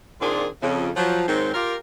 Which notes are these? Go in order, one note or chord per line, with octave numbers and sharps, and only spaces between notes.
A#2 D#3 C4 D4 F4 G#4
F2 C#3
F3 F#3
G#2 D#3 F#3 C4
F4 G4 A#4